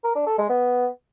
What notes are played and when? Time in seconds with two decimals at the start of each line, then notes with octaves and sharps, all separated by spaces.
0.04 A#4
0.15 D4
0.27 A4
0.38 G#3
0.49 B3